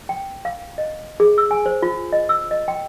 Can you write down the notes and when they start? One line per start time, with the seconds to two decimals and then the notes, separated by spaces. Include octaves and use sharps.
0.09 G5
0.45 F5
0.78 D#5
1.20 G#4
1.38 E6
1.51 G#5
1.66 C5
1.82 F4
2.13 D#5
2.29 E6
2.51 D#5
2.68 G5